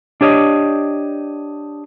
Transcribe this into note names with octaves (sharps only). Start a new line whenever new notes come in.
D4 G4 C#5 D#5